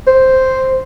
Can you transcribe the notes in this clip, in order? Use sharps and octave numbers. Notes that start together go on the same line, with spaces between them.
C5